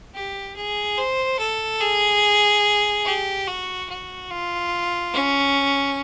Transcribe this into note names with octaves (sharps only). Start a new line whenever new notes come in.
G4
G#4
C5
A4
G#4
G4
F#4
F#4
F4
C#4